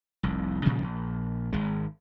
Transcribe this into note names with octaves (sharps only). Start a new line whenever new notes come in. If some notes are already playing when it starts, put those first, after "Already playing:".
F1 C2
A#2 C#3 F3 G3
A#1
G#1 G#3